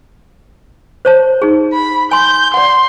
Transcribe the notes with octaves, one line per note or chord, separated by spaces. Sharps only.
C5 C#5 A5
D#4 G#4
B5
G#5 C6 G6
D5 F#5 C6